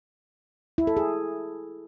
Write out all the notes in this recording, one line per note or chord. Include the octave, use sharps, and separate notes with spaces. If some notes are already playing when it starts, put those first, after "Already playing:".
E4
A4
G#4